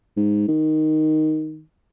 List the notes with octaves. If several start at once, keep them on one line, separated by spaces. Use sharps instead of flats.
G#2
D#3